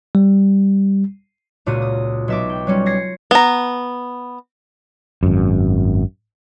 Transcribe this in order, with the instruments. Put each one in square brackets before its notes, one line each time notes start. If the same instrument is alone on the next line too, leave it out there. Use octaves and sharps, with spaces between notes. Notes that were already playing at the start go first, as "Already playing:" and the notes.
[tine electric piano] G3
[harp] C#2 A#2 F#4 F5 D#7
D#6
B1 E5 D6
G5
F#3 G3 C#4 F4
G#6 A#6 C7 C#7
[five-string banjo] B3 A#5
[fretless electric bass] G#1 F#2